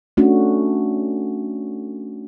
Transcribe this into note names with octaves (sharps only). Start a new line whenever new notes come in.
A3 C#4 D4 F#4